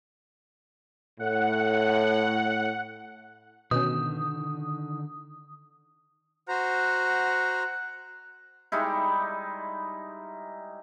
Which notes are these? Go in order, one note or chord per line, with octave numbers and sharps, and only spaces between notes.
A2 F#5
B2 D3 D#3 C#4 D#6
F#4 C5 F#5 A#5
G3 G#3 D#4 E4